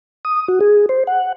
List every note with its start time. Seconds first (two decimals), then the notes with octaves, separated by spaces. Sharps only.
0.25 D#6
0.48 F#4
0.60 G#4
0.89 C5
1.07 F#5